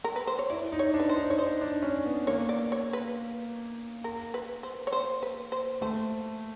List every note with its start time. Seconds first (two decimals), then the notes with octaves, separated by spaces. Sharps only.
0.04 A#4
0.16 B4
0.27 C5
0.39 C#5
0.50 E4 D5
0.72 D#4
0.79 C#5
0.94 D4
1.00 B4
1.09 C5
1.16 D#4
1.30 C#5
1.38 D#4 C5
1.61 D4
1.82 C#4
2.06 B3
2.27 A#3 C#5
2.49 D5
2.72 C#5
2.93 B4
4.04 A#4
4.34 B4
4.63 C5
4.87 C#5
4.92 C5
5.23 B4
5.52 C5
5.81 A3 C5